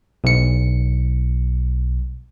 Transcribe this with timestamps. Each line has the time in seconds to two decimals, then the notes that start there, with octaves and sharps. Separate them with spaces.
0.24 B1 C#7